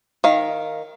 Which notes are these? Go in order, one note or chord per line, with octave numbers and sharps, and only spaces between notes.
D#3 F5